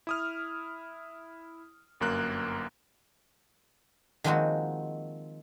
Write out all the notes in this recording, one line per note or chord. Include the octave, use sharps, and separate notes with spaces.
E4 D#6 F6
G1 F#2 A#3 F#6
D#3 F3 G#3 A#3 C4 F#4